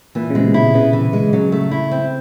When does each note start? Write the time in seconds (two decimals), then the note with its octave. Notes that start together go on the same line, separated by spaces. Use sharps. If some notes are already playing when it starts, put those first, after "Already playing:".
0.15 A#2 E3
0.30 C#3
0.35 C3 G#3
0.45 B2
0.54 E4
0.74 C#3 B3
0.93 E3
1.13 G#3
1.33 C#3 F#3
1.52 A3
1.71 E4
1.91 C4